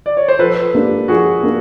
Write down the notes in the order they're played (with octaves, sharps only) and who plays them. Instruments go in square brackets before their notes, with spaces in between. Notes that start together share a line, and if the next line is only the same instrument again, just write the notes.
[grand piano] D5
C#5
C5
[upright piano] F3 [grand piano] A4 B4
[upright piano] A#3 D4 G4
[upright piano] F3 [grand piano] F#4 G#4
[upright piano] A#3 D4